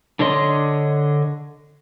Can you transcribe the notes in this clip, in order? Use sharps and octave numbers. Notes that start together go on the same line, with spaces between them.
D3 D4 C#5 D#5 C6